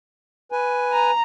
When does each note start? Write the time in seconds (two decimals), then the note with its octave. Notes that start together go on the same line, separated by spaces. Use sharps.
0.52 B4 G#5
0.92 A#5